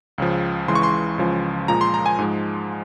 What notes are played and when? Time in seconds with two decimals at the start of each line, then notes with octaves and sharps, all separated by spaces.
0.18 C#2 C#3 F3
0.68 C#2 C#3 E3 G#3 C6
0.75 C#6
0.83 C6
1.18 C#2 C#3 F3 G#3
1.68 A#2 F3 G#3 A#5
1.81 C6
1.94 A#5
2.06 G#5
2.19 G#2 F3 G#3